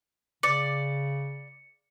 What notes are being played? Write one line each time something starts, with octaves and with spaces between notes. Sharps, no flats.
C#3 D5 C#7